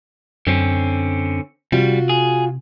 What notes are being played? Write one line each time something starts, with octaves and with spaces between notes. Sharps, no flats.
F#2 D3 C4 C#4
C3 G3 F4 F#4
G#4